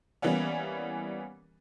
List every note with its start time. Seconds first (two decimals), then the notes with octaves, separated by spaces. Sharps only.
0.22 E3 G3 A#3 B3 C#4